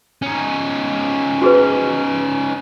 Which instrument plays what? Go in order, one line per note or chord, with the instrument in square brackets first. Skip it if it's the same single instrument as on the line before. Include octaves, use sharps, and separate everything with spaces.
[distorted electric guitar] C#4 D#4
[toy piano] F#4 G#4 B4